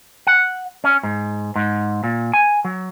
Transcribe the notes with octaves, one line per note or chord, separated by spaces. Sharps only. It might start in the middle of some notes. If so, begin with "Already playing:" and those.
F#5
C#4
G#2
G#2
A#2
G#5
F#3